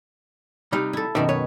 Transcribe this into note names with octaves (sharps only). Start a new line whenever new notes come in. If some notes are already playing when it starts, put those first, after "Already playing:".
C3 G3 D#4
E4 A4
F#2 B2 D#3 D#4 D5 E5
B4 C#5